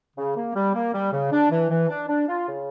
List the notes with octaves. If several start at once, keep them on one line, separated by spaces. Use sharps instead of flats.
C#3
A#3
G3
A#3
G3
C#3
D4
E3
E3
D4
D4
F4
C#3